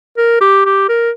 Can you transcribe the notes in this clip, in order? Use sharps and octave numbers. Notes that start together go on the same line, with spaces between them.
A#4
G4
G4
A#4